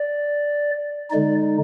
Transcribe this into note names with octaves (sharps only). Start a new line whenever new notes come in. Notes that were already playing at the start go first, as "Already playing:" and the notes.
Already playing: D5
D3 G#3 D#4 D5